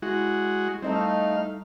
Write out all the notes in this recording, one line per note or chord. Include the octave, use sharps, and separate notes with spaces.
G#3 E4 F#4
G3 A3 C4 D#4 D#5 E5
F5